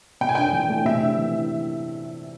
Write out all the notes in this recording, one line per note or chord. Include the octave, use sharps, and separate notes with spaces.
C3 G5
G#5
D4 G5
E3
A3
C3 E5
D4
E3